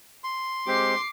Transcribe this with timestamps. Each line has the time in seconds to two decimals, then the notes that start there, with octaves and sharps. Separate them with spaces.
0.24 C6
0.67 G#3 C4 G4 D6 C7